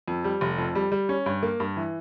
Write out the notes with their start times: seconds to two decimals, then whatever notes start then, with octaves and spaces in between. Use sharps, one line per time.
0.08 F2
0.24 G3
0.41 F1
0.58 F2
0.75 G3
0.92 G3
1.09 C#4
1.26 G2
1.43 A#3
1.60 G2
1.76 E3